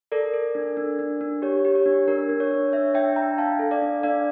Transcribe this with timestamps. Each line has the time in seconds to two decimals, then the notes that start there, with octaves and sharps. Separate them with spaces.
0.12 A4 A#4 D5
0.34 A4
0.55 D4
0.77 D4
0.99 D4
1.21 D4
1.42 G4 C#5
1.65 G4
1.75 C#5
1.86 D4
2.08 D4 A#4
2.29 D4
2.40 C#5
2.51 D4
2.73 D4 C#5 E5
2.94 D4 E5 G5
3.16 D4 G5 A#5
3.38 D4 F5 A5
3.59 A4
3.71 D5 F5
3.82 D4
4.03 D4 D5 F5